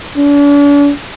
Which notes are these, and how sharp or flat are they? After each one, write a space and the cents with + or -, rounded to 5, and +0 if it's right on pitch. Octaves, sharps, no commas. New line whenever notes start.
D4 -45